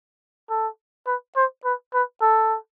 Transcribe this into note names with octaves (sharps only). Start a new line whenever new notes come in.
A4
B4
C5
B4
B4
A4